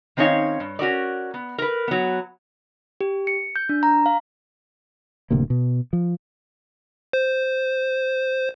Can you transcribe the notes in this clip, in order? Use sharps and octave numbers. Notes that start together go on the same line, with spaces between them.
D#3 C4 C#4 D#4 C#5 F5
G2
C#4 F#4 A#4 D5
B3
A#4 B4
F#3 B3
G4
C#7
G6
D4
A#5
F5
D1 D2 C3 A#3
B2
F3
C5